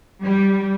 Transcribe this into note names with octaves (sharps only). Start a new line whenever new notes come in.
G3